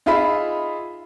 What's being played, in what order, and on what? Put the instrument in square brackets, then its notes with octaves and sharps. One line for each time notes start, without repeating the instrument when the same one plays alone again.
[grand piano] D#4 F4 G#4 E5 B5